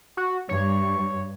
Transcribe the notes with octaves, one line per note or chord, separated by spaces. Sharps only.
F#4
G2 C#5